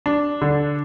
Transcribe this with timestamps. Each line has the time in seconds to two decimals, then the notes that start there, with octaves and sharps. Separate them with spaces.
0.06 D4
0.41 D3